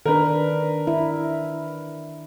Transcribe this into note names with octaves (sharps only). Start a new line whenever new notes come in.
D#3 D4 A#4 B4
E4